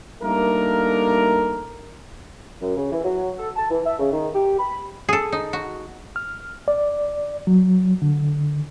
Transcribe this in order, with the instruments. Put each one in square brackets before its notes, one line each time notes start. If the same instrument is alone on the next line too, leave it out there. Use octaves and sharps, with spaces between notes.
[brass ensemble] G3 A3 A#3 D4 D#4 A#4
[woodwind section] F#2
C#3
E3
F#3
A4
A5
E3
E5
C#3
D#3
G4
B5
[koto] G#4 A4
D#4
F#4
[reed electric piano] F6
D5
F#3
D3